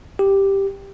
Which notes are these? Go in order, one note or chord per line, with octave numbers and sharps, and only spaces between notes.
G4